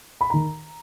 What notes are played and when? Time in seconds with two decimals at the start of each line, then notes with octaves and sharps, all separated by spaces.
0.21 B5
0.30 D#3 A#5